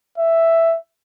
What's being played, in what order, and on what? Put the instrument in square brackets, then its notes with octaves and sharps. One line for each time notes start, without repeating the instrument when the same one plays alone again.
[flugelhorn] E5